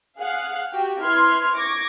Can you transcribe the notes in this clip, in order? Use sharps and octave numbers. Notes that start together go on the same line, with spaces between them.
G#4 F5 F#5
F#4 G4 G5
E4 B4 C6 F6 G#6
C#6 D6 G#6 A#6 D7